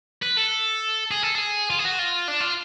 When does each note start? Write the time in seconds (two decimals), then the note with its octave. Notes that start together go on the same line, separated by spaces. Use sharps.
0.23 B4
0.37 A4
1.11 G#4
1.23 A4
1.35 G#4
1.70 F4
1.79 G#4
1.85 F#4
1.99 F4
2.28 D4
2.41 F4